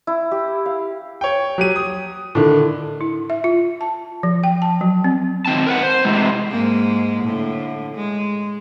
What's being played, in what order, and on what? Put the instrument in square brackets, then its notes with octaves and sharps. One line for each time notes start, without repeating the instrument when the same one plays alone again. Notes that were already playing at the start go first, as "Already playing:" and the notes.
[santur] E4
G4
F5
[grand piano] C#5 G5
F#3 G4 D#7
D#6
A2 D3 D#3
[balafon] E4
E5
F4
A5
F3
G5
A5
F#3
C4
[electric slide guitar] D#3 C4 A5
A#4 B4 F#5
C5
A2 C3 E3 G#3
[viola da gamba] G#2 G#3 A#3
A2 D3
G#3